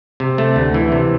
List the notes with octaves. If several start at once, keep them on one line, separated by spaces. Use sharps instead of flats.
C3
A3
D2
E3
C3